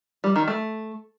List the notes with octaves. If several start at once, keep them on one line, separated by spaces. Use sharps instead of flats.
G3
D#3
A3